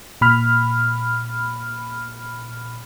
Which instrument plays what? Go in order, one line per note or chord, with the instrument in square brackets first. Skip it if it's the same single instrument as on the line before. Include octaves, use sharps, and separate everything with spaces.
[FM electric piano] A#2 B5 F6